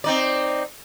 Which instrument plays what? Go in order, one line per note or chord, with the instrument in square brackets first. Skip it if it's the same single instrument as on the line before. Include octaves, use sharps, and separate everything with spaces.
[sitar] C4 D#4 D5